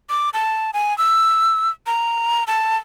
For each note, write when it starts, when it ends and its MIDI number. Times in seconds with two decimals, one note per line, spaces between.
0.10 0.30 86
0.34 0.71 81
0.74 0.96 80
0.98 1.69 88
1.87 2.44 82
2.47 2.76 81